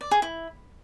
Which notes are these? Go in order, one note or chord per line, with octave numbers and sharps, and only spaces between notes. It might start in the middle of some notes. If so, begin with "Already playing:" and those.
D5
G#4
E4